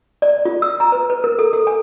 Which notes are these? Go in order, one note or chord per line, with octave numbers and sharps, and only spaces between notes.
D5
F4
E6
A#5
B4
B4
A#4
A4
A4
G#5